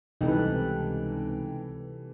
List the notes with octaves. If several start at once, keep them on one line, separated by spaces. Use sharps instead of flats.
C#2 C3 E3 G3 D#4 A4 B4 G5